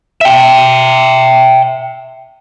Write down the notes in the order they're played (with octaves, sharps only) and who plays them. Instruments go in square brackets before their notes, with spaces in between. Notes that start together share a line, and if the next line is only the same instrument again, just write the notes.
[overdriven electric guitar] E5 G5